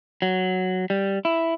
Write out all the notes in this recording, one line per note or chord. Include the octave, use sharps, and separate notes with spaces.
F#3
G3
E4